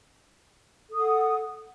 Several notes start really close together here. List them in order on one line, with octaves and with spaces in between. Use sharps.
A4 D#6 F#5